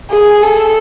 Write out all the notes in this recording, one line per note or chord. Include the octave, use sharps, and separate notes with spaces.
G#4
A4